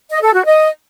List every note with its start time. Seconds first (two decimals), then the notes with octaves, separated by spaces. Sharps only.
0.10 D#5
0.22 A4
0.34 F#4
0.45 D#5